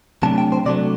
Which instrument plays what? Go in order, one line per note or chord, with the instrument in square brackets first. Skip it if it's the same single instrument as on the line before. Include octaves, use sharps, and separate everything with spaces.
[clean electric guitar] C3 F#3 A3 D4 A5
G5
C5
C3 F#3 A3 D4 D5